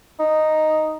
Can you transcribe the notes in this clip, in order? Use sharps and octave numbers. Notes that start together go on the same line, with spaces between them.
D#4